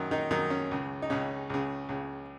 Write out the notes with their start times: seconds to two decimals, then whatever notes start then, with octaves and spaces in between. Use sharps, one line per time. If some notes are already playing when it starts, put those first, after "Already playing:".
Already playing: F#2 D#3
0.11 D#3 D#4
0.31 F#2 D#3 D#4
0.50 C#4
0.71 C#2 C#3
1.02 D#4
1.10 C#2 C#3 C#4
1.50 C#2 C#3
1.89 C#2 C#3